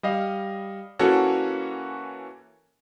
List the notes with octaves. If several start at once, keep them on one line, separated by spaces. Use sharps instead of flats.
G3 D#5 F5
E3 A#3 C#4 F#4 A4 C#5